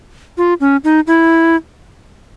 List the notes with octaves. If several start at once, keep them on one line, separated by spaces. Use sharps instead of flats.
F4
C#4
D#4
E4